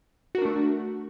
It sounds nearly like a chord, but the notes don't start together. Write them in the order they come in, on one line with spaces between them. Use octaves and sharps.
F#4 A#4 D4 A3